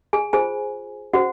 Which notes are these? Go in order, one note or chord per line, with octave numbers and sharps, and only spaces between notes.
G#4 G#5
F4 G#4 C5 G#5
C#4 F#4 G#4 C5 F#5